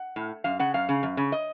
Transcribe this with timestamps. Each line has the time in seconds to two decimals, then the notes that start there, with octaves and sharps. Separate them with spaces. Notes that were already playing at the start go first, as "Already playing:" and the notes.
Already playing: F#5
0.16 A2
0.44 F#2 F5
0.59 C#3 F#5
0.74 F#2 F5
0.89 C#3
1.03 F#2
1.17 C#3
1.32 D#5